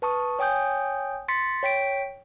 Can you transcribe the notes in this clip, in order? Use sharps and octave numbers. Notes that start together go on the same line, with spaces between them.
B4 A5 C#6 D#6
C#5 G5 G#5 D#6 G6
C6 A6 B6 C#7
C#5 G5 B6 D7